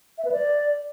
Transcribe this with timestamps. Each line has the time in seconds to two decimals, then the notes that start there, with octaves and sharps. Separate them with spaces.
0.18 E5
0.25 B4
0.32 D5